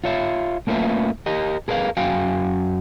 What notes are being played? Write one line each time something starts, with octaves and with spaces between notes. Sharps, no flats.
F4 C#5 E5
A3 A#3 C#4 F4 B4 E5
G4 A#4 D#5
G#4 A#4 B4 D#5 F5
F#2 F#4 F5 G5 G#5